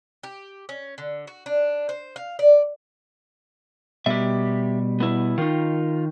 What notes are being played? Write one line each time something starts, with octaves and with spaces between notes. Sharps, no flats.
G4
C#4
D3
F#4
D4
C5
F5
D5
B2 G3 G4 E5
B3 E4
D#3 D#4 F4